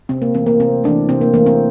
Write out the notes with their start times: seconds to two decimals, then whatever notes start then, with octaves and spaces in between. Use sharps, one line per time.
0.09 C3 C4
0.22 A#3
0.34 E3 A3 C4
0.46 A#3
0.60 C3 C4
0.84 E3 A3 D4
1.09 C3 C4
1.21 A#3
1.34 E3 A3 A#3
1.46 C4